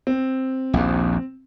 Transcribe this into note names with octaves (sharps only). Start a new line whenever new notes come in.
C4
A#1 D#2